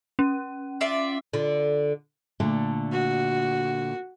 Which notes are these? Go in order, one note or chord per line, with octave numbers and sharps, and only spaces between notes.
C#4
F4 D5 E5
D3 F4
A#2 D3 A3
F#4